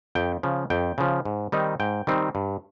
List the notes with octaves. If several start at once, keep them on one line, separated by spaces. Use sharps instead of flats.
F2 G5
C#3 F3
F2 G5
C#3 F3
G#2
D#3 G3 C4 D#4
G#2 G5
D#3 G3 C4 D#4
G2